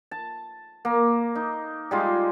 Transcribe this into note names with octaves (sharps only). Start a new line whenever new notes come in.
A5
A#3
D#4
G3 G#3 F4